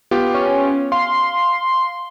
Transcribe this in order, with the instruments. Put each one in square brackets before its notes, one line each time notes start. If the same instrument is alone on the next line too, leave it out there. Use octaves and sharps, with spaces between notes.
[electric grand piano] B3 F4 G4
[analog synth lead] C#4
[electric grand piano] F5 [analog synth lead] C6